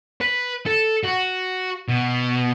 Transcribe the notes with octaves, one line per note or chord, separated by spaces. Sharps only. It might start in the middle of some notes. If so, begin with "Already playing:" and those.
B4
A4
F#4
B2